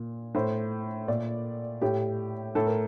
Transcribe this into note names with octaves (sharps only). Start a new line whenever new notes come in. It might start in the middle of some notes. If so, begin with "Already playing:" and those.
Already playing: A#2
A2 C5
A#2 D5
A2 G4
A2 A4
A#4